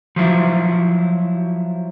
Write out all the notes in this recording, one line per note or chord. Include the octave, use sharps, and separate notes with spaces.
F3 F#3 E4